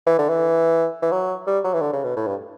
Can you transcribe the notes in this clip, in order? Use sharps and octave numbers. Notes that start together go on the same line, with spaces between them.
E3
D3
E3
E3
F#3
G3
F#3
E3
D3
C#3
B2
A2
G2